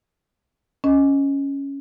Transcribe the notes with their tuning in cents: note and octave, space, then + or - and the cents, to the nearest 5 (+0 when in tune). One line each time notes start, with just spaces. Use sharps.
C#4 +0 D#5 +0